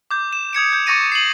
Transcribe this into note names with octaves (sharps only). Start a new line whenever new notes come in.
D6 G6
E7
D#6 G#6 C#7 D7
G6
C#6 D6 A6 A#6 C#7 D#7
C7 F#7